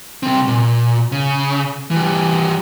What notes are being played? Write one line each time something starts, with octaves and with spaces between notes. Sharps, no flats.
C2 C4
A#2
C#3
E3 G3